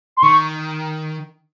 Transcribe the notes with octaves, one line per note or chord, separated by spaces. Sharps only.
C6
D#3 C#6